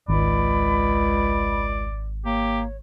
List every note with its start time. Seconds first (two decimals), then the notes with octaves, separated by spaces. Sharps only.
0.08 G#1 C#2 D5 B5
2.26 A#3 G4 C#5